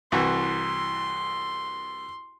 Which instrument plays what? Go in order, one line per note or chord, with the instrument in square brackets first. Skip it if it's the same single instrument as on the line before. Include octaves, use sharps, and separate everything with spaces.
[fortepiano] C2 E3 F#4 [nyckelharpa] C6